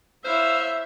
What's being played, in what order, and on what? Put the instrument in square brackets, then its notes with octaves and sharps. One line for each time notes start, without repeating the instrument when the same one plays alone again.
[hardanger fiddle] E4 C#5 [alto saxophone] C5 [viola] E5 [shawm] F5